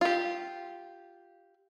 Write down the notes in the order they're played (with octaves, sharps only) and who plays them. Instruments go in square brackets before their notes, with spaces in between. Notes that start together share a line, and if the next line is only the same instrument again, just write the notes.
[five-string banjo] F4 G4